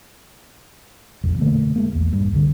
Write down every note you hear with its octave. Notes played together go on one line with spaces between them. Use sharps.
E1 A#1 F2
B2 D3 A3 A#3
G#3 A#3
A#1 E2
G2
C2 D3